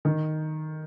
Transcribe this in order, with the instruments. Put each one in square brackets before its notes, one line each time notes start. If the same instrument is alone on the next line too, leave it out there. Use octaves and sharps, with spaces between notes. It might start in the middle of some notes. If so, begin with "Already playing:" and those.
[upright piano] D#3